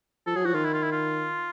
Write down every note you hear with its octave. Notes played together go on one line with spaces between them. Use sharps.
F3 A4
F#3 G#4
F3 F#4
D#3 F4
E4
F4
E4
F4